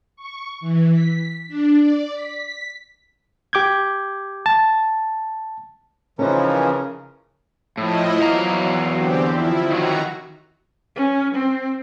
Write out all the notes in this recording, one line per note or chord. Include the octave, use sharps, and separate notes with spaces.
C#6
E3
B6
D4
D5
B6
G4 D6 G6 G#6
A5
C#3 E3 F3 C#4 D#4 A#4 C5
A2 F3 E4 D#5
E2 F#3 F5 A#5
D3 C4 G4
F3 E4
D#3 F#3 F#4 A#5
C#4
C4